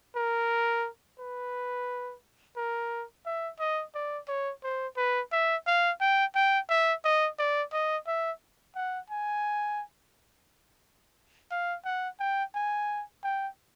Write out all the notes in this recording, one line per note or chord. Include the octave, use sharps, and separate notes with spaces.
A#4
B4
A#4
E5
D#5
D5
C#5
C5
B4
E5
F5
G5
G5
E5
D#5
D5
D#5
E5
F#5
G#5
F5
F#5
G5
G#5
G5